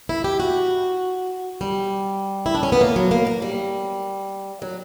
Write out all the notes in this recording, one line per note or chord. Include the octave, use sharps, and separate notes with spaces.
E4
G4
F#4
G3
E4
D4
C#4
B3
A#3
F#3
A#3
A#3
G3
F#3